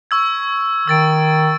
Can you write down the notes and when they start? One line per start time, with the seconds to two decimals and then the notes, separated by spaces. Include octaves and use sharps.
0.11 C#6 E6 G#6
0.88 D#3 E6 A6 D7